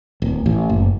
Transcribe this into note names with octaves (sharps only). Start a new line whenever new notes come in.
D1
A1
F#1